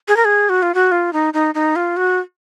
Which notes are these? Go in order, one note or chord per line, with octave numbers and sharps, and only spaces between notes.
G#4
A#4
G#4
F#4
F4
F#4
F4
D#4
D#4
D#4
F4
F#4